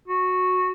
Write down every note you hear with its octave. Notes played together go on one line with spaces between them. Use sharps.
F#4